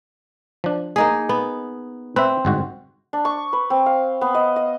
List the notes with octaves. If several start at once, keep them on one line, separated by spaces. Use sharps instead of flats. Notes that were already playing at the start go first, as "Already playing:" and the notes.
F3 D4
A#3 D#4 G#4
B3
C4 B4 E5
G1 G#2 F#4
D4
C#6
B4
C4
F5
B3
D#5
D#5